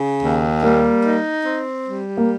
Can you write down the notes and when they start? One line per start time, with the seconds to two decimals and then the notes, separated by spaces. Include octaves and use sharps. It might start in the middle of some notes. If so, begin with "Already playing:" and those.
Already playing: C#3
0.22 D#2
0.63 G3 A#3
1.04 D#4
1.45 C4
1.86 G3
2.17 A#3